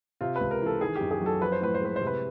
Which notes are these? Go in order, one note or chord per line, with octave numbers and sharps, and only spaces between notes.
C3 F4
B4
C#2
A#4
E3
A4
D#3 G#4
G4
F#2
G#4
F#3
A4
F3 B4
C5
A2 B4
C5
G#3 B4
C5
C3
B4